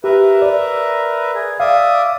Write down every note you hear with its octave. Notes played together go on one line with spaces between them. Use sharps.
G4 A#4 B4 E5
D5
G#4
D5 E5 F5 D#6